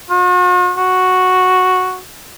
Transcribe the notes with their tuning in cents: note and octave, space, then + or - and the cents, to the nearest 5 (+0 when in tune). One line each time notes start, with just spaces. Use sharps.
F#4 -45
F#4 -5